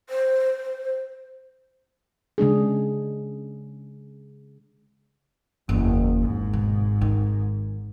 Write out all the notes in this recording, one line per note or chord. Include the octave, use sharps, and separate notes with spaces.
C5
C#3 G#3 D4 G#4
F#1 E2
G#1 G#2
B2
D#3